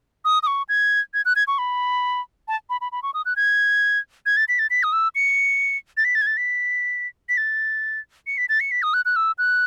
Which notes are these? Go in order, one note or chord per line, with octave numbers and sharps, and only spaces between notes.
D#6
D#6
C#6
G#6
G#6
F#6
G#6
C#6
B5
A5
B5
B5
B5
C#6
D#6
F#6
G#6
G#6
A6
B6
A6
B6
D#6
E6
C#7
A6
B6
A6
G#6
A6
B6
B6
A6
C#7
B6
A6
C#7
B6
D#6
F#6
F#6
E6
F#6